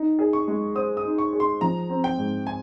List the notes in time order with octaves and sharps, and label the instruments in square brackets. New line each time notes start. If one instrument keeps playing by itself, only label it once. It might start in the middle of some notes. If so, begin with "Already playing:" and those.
Already playing: [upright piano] D#4
G#4
[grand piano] C#6
[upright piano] G#3
[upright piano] C5 [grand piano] D#6
[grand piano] D#6
[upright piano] D#4
[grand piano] C#6
[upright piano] G#4
[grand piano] C6
[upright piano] F3 [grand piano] A#5
[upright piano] C4
[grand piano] G5
[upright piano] G#2
[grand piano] G#5